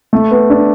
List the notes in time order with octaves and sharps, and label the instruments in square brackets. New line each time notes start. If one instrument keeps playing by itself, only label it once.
[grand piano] A3
B3
D4